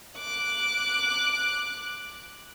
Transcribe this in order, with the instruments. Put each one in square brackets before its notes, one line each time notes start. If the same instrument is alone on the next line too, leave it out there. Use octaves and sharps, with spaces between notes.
[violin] D6 F#6